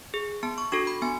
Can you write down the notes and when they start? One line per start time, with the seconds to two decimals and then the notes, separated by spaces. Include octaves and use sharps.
0.14 G#4
0.43 B3 A5
0.58 C#6
0.72 D4 F#4 A4 C#6
0.87 B5
1.02 B3 G#5